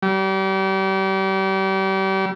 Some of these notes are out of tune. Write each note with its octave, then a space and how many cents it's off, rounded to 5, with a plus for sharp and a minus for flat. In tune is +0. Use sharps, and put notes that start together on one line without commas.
G3 -35